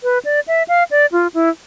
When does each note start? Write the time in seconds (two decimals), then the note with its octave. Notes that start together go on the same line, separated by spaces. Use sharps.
0.03 B4
0.25 D5
0.48 E5
0.68 F5
0.91 D5
1.12 F4
1.34 E4